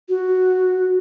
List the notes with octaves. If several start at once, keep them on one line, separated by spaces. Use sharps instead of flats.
F#4